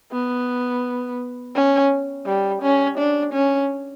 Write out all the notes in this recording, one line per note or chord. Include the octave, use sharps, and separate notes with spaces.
B3
C#4
G3
C#4
D4
C#4